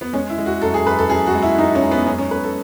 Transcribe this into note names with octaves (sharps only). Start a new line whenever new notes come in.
B3
G#3 C#4
E4
G#3
F#4
F#2 A4
G#4
F#2 B4
A4
F#2 G#4
F#4
G#3
E4
F#2 D#4
C#4
G#3
B3
F#2 C#4
C#4
F#2 B4
A4